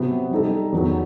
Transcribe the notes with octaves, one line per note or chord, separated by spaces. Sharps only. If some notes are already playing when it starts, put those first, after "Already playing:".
Already playing: C3 F#3 B3 F#4
G3 D#4 A4
E2 D#3 F#3 B3